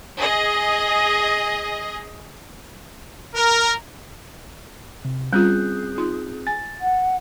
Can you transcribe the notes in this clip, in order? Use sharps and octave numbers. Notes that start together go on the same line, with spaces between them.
G#4 D#5
A#4
C3
G3 C4 C#4 F4 G#4 F#6 G6
D#4 F4
G#5 A6
F#5